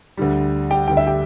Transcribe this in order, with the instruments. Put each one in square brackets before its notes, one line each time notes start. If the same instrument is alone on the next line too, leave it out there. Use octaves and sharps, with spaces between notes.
[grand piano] D2 D3 G3
G4 G5
D2 D3 G3 G5
E5
G4 G5